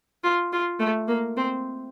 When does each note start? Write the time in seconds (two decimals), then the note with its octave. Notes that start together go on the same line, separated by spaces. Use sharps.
0.24 F4
0.52 F4
0.80 A3
1.08 A#3
1.37 C4